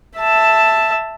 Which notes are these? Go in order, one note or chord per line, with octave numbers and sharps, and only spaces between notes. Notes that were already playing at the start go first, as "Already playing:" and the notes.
E5 A5